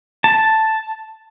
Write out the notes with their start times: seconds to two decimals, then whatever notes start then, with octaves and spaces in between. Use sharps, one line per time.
0.24 A5